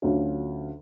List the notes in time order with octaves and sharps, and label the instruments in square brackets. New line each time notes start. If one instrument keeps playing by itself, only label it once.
[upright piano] D2 D3 F#3 C#4 F4